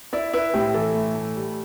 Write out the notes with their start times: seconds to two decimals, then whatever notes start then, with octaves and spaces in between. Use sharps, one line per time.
0.13 E4 D5
0.33 E4 B4
0.54 A2 G4
0.74 E3 A4
0.95 A3
1.15 A3
1.36 G3